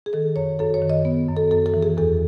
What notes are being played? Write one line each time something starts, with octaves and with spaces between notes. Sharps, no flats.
G#4
D#3 A4
F#2 C#5
F#2 A4
C#5
D#3
D#5
B3
F#2
A4
F#2 A4
A4
E3
G#4
E2 A4